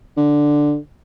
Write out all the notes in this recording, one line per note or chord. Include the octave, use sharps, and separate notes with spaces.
D3